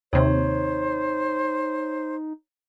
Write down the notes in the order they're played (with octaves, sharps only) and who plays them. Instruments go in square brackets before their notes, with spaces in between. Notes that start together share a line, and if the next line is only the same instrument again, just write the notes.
[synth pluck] D#2 C3 [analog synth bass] D#4 [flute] C5 [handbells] C#5